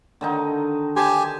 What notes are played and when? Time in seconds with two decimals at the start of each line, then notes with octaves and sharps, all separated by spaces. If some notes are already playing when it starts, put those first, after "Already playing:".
0.21 D3 D#3 D#4
0.96 G4 C5 G#5 A5